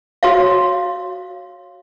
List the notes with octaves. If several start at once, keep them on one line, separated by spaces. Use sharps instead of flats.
F#4 C#5 F5